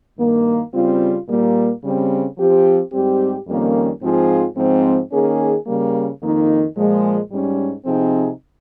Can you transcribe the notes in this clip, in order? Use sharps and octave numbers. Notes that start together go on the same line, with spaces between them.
G2 D#3 A#3
C#3 G3 C4 F4
A#2 G3 A#3
C#3 G3 C4
F3 C4 G4
G#2 G3 C4 G4
F2 D#3 G3 A#3 C#4
G#2 F3 C4 F4 G#4
G#2 F3 C4
D#3 A#3 C#4 G#4
C#3 G3 A#3
F2 D#3 A#3 D#4
A#2 F3 G#3
G#2 G3 C#4
C3 F3 C4 D#4 G#4